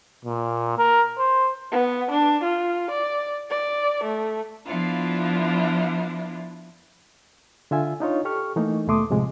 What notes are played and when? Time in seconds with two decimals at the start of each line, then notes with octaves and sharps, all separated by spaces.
0.25 A#2
0.78 A#4
1.18 C5
1.71 B3
2.11 D4
2.43 F4
2.90 D5
3.51 D5
4.03 A3
4.65 F3 B3 D4 E4 F4
7.71 D3 F4 E5 G#5
8.00 D4 D#4 F4 C#5
8.25 G4 A4 C#6 F6
8.56 E3 A3 A#3 D#4
8.87 D#2 B2 A3 C6 D6 D#6
9.10 A2 C3 F3 G#3